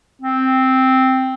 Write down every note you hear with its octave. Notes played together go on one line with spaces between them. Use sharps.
C4